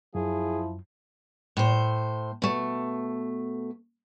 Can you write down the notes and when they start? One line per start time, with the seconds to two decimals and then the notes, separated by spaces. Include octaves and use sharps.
0.15 F#2 F3 E4 G#4
1.57 A2 C5
2.42 B2 A3